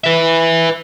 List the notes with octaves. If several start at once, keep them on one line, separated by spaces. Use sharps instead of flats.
B4 E5